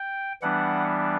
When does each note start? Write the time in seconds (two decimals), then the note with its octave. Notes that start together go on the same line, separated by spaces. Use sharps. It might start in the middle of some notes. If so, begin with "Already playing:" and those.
Already playing: G5
0.42 E3 G3 B3 D4 F#5